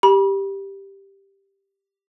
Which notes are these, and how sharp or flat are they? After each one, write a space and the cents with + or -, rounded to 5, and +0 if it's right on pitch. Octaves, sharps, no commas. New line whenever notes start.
G4 +0 B5 -35